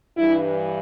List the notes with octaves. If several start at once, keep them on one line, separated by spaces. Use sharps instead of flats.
G2 E3 E4